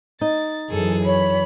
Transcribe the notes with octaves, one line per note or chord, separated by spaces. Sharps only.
D#4 A6
F#2 E3 G#4 A4
C#5 B5